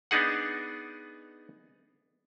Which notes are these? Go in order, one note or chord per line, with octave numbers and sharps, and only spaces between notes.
B3 D4 D#4 G#4 F#5